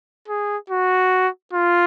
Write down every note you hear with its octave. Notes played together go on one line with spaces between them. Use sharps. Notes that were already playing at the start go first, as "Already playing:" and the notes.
G#4
F#4
F4